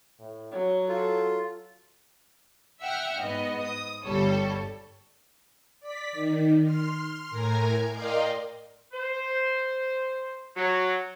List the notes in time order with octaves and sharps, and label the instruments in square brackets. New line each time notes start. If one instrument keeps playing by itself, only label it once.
[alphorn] A2
[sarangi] F#3 [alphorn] C#5
[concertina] F4 [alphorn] A4
[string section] E5 F#5 G5 F6
G#2 B3 D#5
D#6
G1 G3 A4 C#5
[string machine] D5 B6
D#3
C6 F6
A2 A#4 G#5 A#5
A#4 D5 D#5 F5 G5 C6
[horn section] C5
F#3